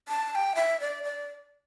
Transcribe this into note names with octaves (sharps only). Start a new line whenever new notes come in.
A5
A5
G5
E5
D5
D5